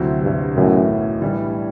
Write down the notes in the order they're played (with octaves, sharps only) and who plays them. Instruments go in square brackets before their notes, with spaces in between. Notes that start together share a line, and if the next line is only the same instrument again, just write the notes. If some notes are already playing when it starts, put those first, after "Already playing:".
Already playing: [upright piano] D2 C3 F#3 C4 E4
[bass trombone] G2
[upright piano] B1 A2 E3 [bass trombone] F#2
[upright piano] A2 E3 G3 D4